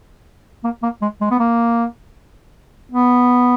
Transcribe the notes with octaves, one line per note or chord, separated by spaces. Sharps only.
A#3
A#3
G#3
G#3
B3
A#3
B3